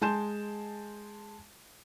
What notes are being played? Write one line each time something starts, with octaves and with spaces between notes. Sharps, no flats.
G#3 G#5 A5 C6 G6 E7